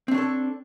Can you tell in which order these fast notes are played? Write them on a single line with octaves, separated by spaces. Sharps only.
C4 D4 C#5 A4